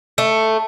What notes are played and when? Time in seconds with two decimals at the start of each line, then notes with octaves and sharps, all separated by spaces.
0.18 A3